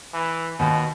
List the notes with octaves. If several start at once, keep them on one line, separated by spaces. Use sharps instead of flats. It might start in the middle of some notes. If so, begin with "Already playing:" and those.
E3
D#2 B2